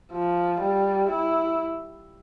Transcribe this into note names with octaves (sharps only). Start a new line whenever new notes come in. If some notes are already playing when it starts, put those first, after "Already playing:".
F3
G3
E4